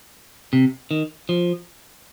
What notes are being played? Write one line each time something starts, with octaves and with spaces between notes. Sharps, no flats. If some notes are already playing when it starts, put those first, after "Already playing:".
C3
D#3
F3